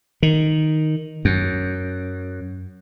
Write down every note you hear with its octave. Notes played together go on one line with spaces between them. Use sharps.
D#3
F#2